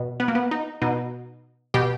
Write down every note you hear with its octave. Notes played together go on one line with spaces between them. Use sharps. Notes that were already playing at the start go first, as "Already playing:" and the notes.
Already playing: B2
B3
A#3
B3
D#4
B2 D#4
B2 G4